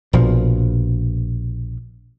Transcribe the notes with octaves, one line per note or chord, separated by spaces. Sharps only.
A#1 B2 F3